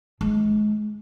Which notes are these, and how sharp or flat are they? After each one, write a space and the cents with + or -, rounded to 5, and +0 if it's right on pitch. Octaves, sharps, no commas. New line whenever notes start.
G#3 +30 D#4 +0